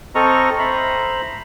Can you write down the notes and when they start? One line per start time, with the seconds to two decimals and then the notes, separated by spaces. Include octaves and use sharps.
0.15 C4 A4 D#5 A#5 C#6 F6
0.59 C5 E5 A#5 B5